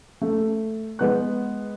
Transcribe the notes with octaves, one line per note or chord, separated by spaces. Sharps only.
A3
G#3 B3 F#6